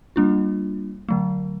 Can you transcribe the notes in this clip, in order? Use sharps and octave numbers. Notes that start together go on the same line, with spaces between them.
G3 A#3 D4 F4
D3 F#3 A3